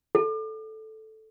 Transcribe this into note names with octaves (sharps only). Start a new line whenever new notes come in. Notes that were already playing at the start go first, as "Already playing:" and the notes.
A4